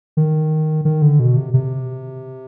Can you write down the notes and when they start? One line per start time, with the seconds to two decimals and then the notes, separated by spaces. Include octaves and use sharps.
0.17 D#3
0.85 D#3
1.02 D3
1.20 B2
1.37 C3
1.54 C3